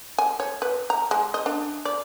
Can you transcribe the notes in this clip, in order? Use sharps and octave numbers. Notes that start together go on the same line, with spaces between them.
G#5
C#5
B4
A#5
G#3
D#5
D4
D5